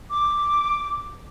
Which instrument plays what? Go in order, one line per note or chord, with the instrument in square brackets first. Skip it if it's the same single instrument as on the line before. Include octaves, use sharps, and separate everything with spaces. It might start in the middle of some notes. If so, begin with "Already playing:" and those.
[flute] D6